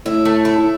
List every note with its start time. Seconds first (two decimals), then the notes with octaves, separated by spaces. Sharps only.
0.05 A2 E4
0.25 A3
0.45 E4
0.58 A2